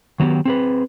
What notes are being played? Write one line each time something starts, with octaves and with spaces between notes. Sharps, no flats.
D#3 F#3 B3 G4
C4 G#4 B4